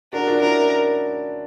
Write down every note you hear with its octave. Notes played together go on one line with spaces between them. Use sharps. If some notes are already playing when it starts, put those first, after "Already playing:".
D4 F#4 A#4
D4 F#4
C#4 E4 A#4